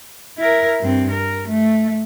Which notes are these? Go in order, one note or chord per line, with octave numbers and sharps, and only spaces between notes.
E4 A#4
G2 C4
A#4
A3